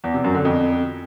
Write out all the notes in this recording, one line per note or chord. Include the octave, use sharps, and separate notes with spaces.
E2
C3
F#2
D3
F2